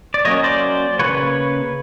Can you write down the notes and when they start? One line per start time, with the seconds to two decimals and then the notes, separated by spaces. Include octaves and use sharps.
0.14 D5
0.25 F#3 A#3 C#4 C#5 D#5
0.43 C5 D5
0.99 F3 A#3 B4 C#5
1.04 C#3